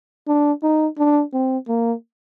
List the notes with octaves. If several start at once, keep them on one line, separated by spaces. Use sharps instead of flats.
D4
D#4
D4
C4
A#3